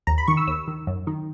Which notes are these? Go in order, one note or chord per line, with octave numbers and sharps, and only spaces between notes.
D#2 A#5
B5
D#3 C#6
E6
D#2 E6
D#3
F#2
D#3